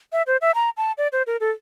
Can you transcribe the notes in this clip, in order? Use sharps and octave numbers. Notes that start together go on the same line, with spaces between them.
E5
C5
E5
A#5
A5
D5
C5
A#4
A4